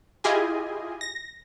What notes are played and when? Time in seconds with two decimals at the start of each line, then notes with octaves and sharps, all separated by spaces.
0.24 E4 F4 G4 G#4 D#5 G#5
1.01 A#6